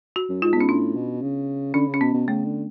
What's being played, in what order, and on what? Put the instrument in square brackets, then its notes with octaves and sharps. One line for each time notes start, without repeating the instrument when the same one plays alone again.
[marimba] F#4
[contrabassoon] F#2
[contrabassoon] G#2 [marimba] F4
[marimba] B3
[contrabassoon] G#2 [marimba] C#4
[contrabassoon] A2 [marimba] D4
[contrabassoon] B2
C#3
[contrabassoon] D3 [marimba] C#4
[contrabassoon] C#3
[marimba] C#4
[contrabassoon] B2 [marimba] B3
[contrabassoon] B2
[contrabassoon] C#3 [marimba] A3
[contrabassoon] D3